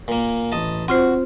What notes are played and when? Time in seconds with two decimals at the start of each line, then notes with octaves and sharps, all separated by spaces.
0.08 A#2 A#3
0.52 A1 D#5 A5
0.88 C4 F4 F#4 C5